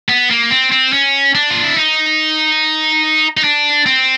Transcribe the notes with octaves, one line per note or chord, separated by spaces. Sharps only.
B3
A#3
C4
C4
C#4
D4
F4
E4
D#4
D#4
D4
C4